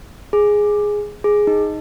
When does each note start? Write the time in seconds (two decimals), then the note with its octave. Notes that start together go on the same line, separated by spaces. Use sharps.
0.33 G#4
1.24 G#4
1.47 D#4